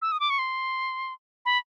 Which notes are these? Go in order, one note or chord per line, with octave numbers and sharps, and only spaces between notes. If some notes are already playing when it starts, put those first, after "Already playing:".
E6
D#6
D6
C#6
C6
B5